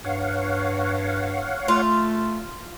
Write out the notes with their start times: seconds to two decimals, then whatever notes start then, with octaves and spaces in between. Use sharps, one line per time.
0.05 G2 C#5 F5 F#5
1.68 A3 F4